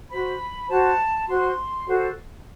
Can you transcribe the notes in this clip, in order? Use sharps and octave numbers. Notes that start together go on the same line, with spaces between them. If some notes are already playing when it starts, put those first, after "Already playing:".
F#4 C5 B5
F#4 C5 A5
F#4 C5 C6
F#4 A4 C5